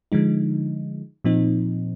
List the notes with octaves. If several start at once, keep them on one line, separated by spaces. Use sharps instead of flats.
D3 F3 G#3 D#4
A#2 F3 C4 D#4